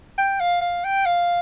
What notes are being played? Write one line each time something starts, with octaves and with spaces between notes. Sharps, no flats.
G5
F5
F5
G5
F5